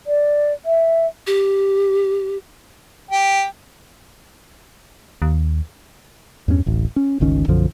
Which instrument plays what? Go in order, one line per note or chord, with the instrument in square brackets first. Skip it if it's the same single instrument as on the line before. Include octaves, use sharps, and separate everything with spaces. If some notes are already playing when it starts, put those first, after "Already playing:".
[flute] D5
E5
[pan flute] G4
[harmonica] G4
[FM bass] D#2
[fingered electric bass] E2 G2 A3 C#4
D1 A1
C#4
G1 C#2 D#3 C#4
B1 F#2 D3 F3